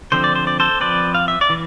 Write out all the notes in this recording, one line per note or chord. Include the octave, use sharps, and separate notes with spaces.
D3 F3 C4 C5
D5
C5
D5
A4 C5
F3 C4 B4 D5
F5
E5
D5
E3